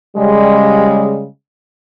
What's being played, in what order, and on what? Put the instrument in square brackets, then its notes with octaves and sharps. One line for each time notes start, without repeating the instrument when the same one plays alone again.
[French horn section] C#3 G3 G#3